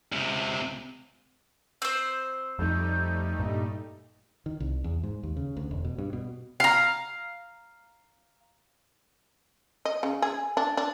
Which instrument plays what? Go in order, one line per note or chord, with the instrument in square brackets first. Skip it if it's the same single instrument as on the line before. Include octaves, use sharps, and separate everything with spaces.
[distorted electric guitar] C#2 C3
[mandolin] C4 C5
[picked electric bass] F2 [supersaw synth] G3 A3 D#4 [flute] G6
[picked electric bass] G2 A#2 [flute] D#5
[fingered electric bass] D#3
C2
E2
G#2
D#2
C#3
D2
E1
B2
G2
B2
[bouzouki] F5 A#5
[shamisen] D#5
C#3
G#4
D4
D4